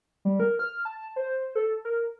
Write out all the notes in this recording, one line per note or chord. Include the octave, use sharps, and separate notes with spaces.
G3
A#4
F6
A5
C5
A4
A#4